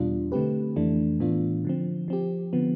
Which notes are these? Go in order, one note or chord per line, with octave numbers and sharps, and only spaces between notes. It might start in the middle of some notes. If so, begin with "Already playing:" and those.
Already playing: E2 B2 G3 D4 F4
D3 A3 C4 G4 B4
F2 E3 A3 D4
A2 E3 B3 D4 F4
D3 F3 C4
F3 C4 G4
D3 F3 B3